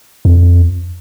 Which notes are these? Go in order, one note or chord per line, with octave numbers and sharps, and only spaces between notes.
F2